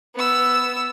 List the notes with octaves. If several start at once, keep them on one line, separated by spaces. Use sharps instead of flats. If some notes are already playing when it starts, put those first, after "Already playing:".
B3 E6